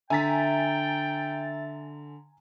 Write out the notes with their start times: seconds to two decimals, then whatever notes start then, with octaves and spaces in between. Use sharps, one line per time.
0.10 D3 E5 G5 G#5 A#5 A6 B6